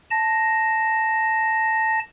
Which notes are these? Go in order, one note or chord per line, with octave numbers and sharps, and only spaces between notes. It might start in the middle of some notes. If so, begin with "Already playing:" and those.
A5 A#6